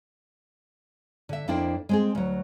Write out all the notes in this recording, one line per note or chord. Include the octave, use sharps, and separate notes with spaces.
D3 E5
F2 A#3 D4 E4 C5 G5
G#3 C4 G#4
D2 F#3